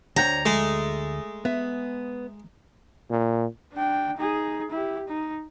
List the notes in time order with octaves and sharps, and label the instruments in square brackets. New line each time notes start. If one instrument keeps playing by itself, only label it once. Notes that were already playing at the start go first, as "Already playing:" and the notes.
[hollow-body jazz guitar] D2 F#5 G5 [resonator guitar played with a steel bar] D4 C5 C#5 [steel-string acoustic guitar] A#5
[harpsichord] G#3 [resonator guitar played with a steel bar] A3
[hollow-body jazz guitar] B3 [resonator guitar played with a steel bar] E5
[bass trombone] A#2
[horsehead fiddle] D4 G5
D#4 G#4
E4 G4
D#4